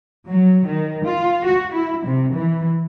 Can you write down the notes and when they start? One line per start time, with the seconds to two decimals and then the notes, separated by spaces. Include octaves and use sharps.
0.29 F#3
0.67 D#3
1.06 F4
1.45 F#4
1.74 E4
2.06 C3
2.36 E3